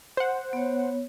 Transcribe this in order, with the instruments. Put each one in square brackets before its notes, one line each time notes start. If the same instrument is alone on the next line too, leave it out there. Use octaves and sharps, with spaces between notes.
[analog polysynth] C5 F#5
[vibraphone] B3 C#5